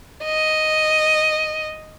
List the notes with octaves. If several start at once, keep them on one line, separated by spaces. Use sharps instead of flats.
D#5